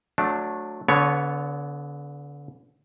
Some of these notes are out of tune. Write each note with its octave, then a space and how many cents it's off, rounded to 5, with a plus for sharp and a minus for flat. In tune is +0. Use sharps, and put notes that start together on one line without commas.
F#3 -20 A3 -10 D4 +0
D3 -35 B3 +0 C#5 +0